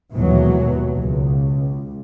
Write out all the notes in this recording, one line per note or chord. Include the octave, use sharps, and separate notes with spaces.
D#2 G#2 B2 E3 F#3
C#2